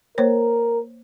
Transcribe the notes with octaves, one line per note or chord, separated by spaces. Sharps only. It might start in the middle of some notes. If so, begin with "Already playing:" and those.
A#3 A#4 C5 C#5